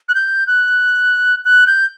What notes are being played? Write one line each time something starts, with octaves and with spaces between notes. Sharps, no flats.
F#6
G6
F#6
F#6
G6